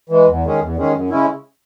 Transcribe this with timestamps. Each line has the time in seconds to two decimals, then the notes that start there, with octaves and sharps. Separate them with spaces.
0.09 E3 G#3
0.27 E2
0.43 D#3 G#3 C#4 G#4
0.59 E2
0.77 D#3 G#3 C#4 G#4
0.93 F#2
1.09 C#3 G#3 C#4 E4